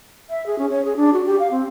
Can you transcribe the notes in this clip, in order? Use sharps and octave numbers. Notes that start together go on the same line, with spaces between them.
E5
G#4
C#4
C#5
G#4
D4
F#4
G4
F5
C4